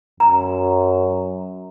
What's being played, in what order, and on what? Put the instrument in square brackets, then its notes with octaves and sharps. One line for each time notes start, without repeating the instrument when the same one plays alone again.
[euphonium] F#2 [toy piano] A#5